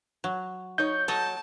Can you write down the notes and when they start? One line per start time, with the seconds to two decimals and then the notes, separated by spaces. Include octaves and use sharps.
0.24 F#3
0.78 D#4 C#5 G6
1.08 F#3 A4 C#5 D#5 A5